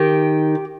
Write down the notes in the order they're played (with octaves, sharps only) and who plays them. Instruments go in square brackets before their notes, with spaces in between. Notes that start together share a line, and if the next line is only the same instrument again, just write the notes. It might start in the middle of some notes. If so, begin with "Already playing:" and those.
Already playing: [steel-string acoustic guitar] D#3 G4